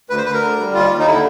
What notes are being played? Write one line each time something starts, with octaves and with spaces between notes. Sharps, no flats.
D2 B4
C5
D2 B4
A#4
D3
G3
D#2 F4
D#2
D#4
D3 E4